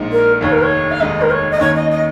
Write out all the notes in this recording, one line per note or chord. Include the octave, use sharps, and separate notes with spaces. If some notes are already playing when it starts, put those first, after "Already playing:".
Already playing: A#1 A#2 G#3 D#4
A#4
F1 D#2 D#3 C#5
A#4
C#5
F5
F1 D#2 D#3 G#3 D#4 D#5
A#4
C#5
D#5
D#2 D#3 A#3 C#4 C#5
D#5
D#5